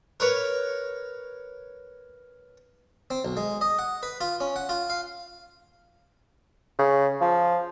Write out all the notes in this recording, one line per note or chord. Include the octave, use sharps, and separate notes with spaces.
A#4 B4 C#5
C4
B1
G#3
D#5
F#5
B4
F4
C#4
F#5
F4
F5
C#3
F3